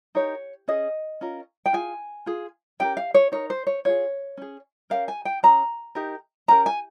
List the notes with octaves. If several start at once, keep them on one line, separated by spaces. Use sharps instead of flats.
D#4 G4 A#4 C#5
C#4 G#4 D#5
C#4 F4 A#4
G5
F4 G#4 G#5
F4 G#4
C#4 G4 A#4 G5
F5
C#5
D#4 A#4 C#5
C5
C#5
F4 G#4 C#5
C#4 G#4
C#4 G4 A#4 F5
G#5
G5
C#4 G#4 A#5
D#4 G4 A#4
C#4 G4 A#4 A#5
G#5